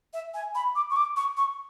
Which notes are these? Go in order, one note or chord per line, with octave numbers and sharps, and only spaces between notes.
E5
G#5
B5
D6
C#6
D6
C#6
C#6